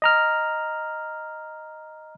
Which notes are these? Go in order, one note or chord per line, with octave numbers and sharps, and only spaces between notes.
D#5 A#5 F6